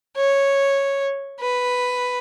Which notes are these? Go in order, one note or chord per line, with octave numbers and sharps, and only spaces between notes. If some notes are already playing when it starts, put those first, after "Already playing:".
C#5
B4